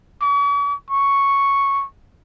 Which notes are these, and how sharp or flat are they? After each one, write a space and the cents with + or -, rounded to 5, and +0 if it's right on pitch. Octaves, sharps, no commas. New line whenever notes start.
C#6 +45
C#6 +0